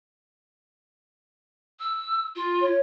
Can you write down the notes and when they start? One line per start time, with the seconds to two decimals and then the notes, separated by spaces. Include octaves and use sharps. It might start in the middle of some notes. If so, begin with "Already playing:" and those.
1.79 E6
2.35 F4
2.62 C#5